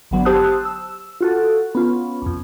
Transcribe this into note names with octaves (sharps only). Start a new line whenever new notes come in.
G#1 D3 F#3 B3
G4 C5 A5 D#6 E6 F#6
E6
F4 F#4 A4
B3 C#4 F4
B1 F2